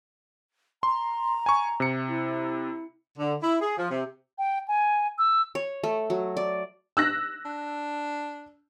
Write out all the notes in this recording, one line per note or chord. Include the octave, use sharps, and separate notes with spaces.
A#5 C6
G#5 C#6
C3 C#7
E4
D3
E4
G#4
F3
C3
G5
G#5
E6
C#5
A3
F#3
D5
E6 F#6 A#6
D4